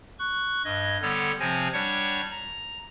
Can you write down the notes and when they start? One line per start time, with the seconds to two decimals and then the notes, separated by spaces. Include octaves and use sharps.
0.19 C#6 F#6
0.65 G2 D#5 G#6
1.02 D3 G3 B3 A4 C#5
1.40 C3 F3 C4 C#5 G#5 A#6
1.73 G3 D4 C#5 F#5 C#6
2.31 A#5